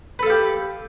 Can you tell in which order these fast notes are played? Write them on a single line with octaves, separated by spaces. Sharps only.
B4 A4 F5 G4